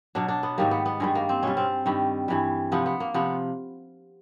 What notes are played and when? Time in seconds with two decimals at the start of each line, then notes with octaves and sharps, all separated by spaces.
0.15 B2 F#3 D4
0.28 D4
0.43 B3
0.58 G#2 D#3 G3 A#3
0.71 B3
0.86 B3
1.00 G2 D#3 G3 G#3
1.15 A#3
1.29 C4
1.43 B2 G3 C#4
1.57 C4
1.86 G2 D#3 G3
2.28 G2 E3 G3
2.72 C3 F3 B3
2.86 B3
3.00 A#3
3.14 C3 F3 B3